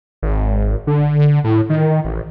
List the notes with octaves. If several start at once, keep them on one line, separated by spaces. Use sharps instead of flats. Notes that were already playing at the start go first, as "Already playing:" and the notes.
G#1
D3
A2
D#3
A1